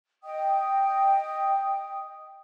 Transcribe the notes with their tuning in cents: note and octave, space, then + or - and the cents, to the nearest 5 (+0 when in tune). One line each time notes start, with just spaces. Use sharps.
D#5 +0 G5 +0 D#6 +0